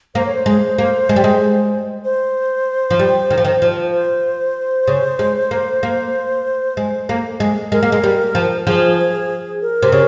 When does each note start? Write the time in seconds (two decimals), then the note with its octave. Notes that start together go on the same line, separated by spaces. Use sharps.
0.15 A#3 C5
0.25 C#5
0.35 C5
0.46 G#3
0.78 A#3
1.09 G#3
1.16 G3
1.24 G#3
2.05 C5
2.90 F3
2.99 G3
3.30 D#3
3.38 F3
3.45 D#3
3.62 F3
3.93 C5
4.87 C#3
5.19 G#3
5.51 A#3
5.83 A#3
6.77 G#3
7.09 A#3
7.40 G#3
7.72 G#3 A#4
7.83 A#3
7.92 G#3
8.03 G3
8.35 F3
8.67 F3 G#4
9.62 A#4
9.82 C3
9.92 C#3